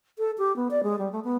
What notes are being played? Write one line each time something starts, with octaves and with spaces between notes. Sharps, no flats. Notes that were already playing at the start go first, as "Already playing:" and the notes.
A4
G4
B3
D5
G#3
G3
A3
B3